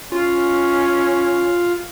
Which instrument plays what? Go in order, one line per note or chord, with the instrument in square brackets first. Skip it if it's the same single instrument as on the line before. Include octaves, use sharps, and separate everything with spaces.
[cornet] C#4 [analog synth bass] F4